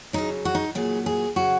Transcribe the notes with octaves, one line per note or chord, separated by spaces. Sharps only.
C#3 F#3 D#4
F#4
D#4
A#2 F#3 G#4
G#4
C#3 F#3 F#4